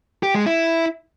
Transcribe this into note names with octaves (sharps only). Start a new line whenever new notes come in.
G4
G#3
E4